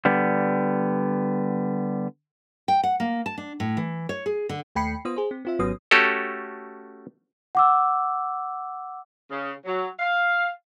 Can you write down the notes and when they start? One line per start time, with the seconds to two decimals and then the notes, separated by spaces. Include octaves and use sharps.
0.05 D3 G3 B3
2.68 G5
2.83 F#5
3.00 A#3
3.26 A5
3.38 D4
3.60 A2
3.77 E3
4.09 C#5
4.26 G#4
4.49 D3
4.76 D#2 A3 G5 B5 C7 C#7
5.05 B3 F4 C5 D#6
5.16 G#4 C5
5.31 C4
5.45 C4 F4 E5
5.59 G#1 F#3 B3 C#4 D#6
5.91 A3 C#4 F#4 G4 A4
7.55 F#5 D6 E6
9.31 C#3
9.65 F#3
9.99 F5